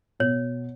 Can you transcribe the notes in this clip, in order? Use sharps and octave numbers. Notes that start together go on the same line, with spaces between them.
B2 C#5